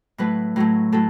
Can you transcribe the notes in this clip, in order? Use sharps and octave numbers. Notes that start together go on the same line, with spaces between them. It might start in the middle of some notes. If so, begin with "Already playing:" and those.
A2 F#3 A3 B4
A2 F#3 A3
A2 F#3 A4